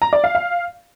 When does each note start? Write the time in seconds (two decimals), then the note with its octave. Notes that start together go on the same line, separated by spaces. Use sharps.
0.02 A#5
0.13 D5
0.24 F5
0.35 F5